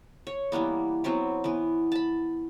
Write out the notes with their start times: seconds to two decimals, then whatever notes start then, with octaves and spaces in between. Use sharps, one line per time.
0.27 C#5
0.52 E3 G3 A#3 B3
1.04 F#3 B3 C4 E4
1.44 E3 B3
1.92 A5 B5